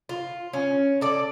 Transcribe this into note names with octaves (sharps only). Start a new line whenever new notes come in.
F4
C#4
A4 D5